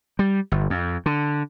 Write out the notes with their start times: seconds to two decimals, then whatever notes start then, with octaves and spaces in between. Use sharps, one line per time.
0.19 G3
0.52 G1
0.70 F2
1.06 D3